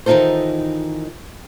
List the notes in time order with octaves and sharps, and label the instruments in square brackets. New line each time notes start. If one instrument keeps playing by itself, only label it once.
[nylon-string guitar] D#3 E3 D#4 F4 A4 C5